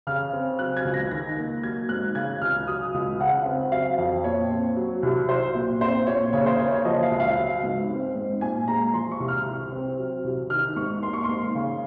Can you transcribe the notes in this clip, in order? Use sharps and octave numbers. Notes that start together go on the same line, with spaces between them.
C#3 F6
C4
F#3 F#6
G#6
C#2
A#6
D#3 A#6
A#3
F#3 G#6
G#2 F#6
C#3 G#6
C#2 F6
F#3 D#6
C#2
C#3 F#5
C4
F#3 F5
F2
A#2 C#5
C4
F#3
C2
F#3 C5
A#2
C4 C5
A#2 C#5
C#3 C#5
C5
A#3 C#5
C#5
F3 D#5
F5
C#2
F5
F#3
G#2
C4
G#2
A#2 G#5
G#3 A#5
F3 C6
C#6
C2
F6
C3
C4
F#3
C2
D#3 F6
G#2 C#6
A#3 C6
C#6
C6
G#2
C#3